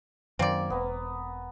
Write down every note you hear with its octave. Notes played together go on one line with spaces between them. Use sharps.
F#2 D#3 A#3 C4 D5
E1 B3 A#4